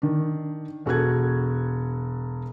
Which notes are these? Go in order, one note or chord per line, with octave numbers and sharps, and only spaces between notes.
D#3 D4
E1 F#4 A4 F#6 G#6